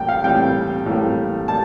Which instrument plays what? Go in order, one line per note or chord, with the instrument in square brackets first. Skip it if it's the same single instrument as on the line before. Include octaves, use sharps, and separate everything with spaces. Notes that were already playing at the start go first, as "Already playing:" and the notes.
Already playing: [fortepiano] A2 E3 G3 A#3 G5
F5
A2 E3 G3 A#3 G5
A2 E3 G3 A#3
G3 A#3 A5